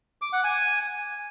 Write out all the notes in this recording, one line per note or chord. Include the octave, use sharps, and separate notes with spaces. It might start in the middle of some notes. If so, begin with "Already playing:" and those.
D6
F#5
G#5